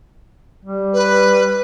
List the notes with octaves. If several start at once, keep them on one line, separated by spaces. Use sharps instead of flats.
G3
B4